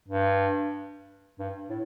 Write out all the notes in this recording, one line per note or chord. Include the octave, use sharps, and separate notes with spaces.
G2
G2
A2